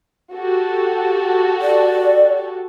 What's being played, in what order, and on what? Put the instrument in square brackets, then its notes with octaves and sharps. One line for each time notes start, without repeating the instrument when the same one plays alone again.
[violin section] F#4 G4 A4
[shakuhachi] D5